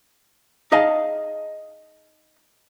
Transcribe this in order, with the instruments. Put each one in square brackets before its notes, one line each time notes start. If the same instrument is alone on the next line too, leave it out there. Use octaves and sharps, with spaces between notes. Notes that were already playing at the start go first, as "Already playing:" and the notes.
[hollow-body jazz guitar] D#4 G#4 D#5 F5 G#5 A5